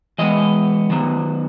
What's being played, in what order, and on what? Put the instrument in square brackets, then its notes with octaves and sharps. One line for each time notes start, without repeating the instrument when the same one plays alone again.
[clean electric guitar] E3 G#3 B3 D#5
D#3 F#3 B3